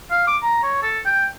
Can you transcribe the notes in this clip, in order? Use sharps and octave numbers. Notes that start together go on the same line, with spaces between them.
F5
D6
A#5
C#5
A4
G5